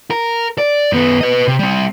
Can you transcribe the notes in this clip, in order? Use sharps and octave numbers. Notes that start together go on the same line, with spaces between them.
A#4
D5
F#2 B3
B4 D#5
C3
G3 C4